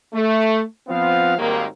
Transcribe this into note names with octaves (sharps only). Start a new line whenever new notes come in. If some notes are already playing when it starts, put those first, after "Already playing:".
A3
F3 B3 C4 F5
G#1 D#2 G#2 D#3 G3 A#3